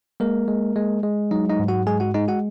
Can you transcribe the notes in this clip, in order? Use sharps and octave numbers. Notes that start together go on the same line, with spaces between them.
G#3 A#3 A#4
G#3
G#3
G#3
F#3 D#4 D#5
D#4 D#5
G#2
F#4 F#5
G#3 G#4 G#5
F#4 F#5
G#3 D#4 D#5
F#4 F#5